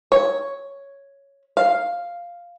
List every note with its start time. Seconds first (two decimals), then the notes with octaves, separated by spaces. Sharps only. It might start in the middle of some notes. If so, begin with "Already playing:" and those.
0.12 C#5
1.57 F5